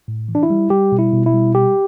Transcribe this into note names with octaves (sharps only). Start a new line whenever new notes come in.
A2
E3
D4
E4
G3
G3 G4
B2
E4
B2
E4
G3
G3 G4